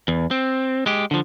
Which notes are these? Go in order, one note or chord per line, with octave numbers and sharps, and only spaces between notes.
E2
C4
G#3 G4
D3 F3